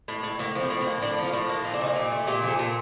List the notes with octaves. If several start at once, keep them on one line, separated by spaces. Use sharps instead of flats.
A2
A2
A2 A#3
F3 C4
A2
C4
A#3
A2 D4
F3 F4
A2
A#3
A#2 D#4
D4
F3 D#4
A#2 G4
A3
A#2 G4
F3
A4
A#2